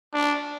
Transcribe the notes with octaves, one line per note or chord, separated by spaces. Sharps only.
D4